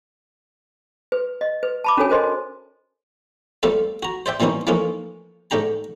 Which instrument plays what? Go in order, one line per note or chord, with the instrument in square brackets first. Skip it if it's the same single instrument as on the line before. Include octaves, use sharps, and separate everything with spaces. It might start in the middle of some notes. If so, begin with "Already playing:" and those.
[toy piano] B4
D#5
B4
A5 B5 D6
C#4 D4 F#4 A4 C#5 G#5
A#4 C5 D#5 C6
[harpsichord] G3 A3 C4 F4 A4 D5
F#4 A#5
C5 D5 E5 G5
A#2 E3 G3 C4 C#4 D#4
E3 F3 A3 A#3 C#4 D#4
G#2 A3 D4 G4 A#5